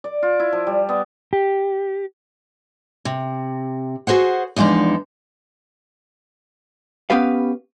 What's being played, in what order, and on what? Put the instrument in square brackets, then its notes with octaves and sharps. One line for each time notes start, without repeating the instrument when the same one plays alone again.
[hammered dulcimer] D5
F4
E4
F3
G3
B3
[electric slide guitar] G4
[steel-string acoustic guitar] C3
F#4 G#4 C5 F#5
E2 F3 G#3 D4 D#4
[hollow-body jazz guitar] B3 C#4 G4 B4 F5